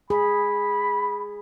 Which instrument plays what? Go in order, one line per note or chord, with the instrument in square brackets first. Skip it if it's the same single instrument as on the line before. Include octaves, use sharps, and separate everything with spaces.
[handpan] G#4 [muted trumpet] B5